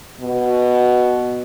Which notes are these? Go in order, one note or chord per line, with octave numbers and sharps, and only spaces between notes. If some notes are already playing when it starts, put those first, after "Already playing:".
B2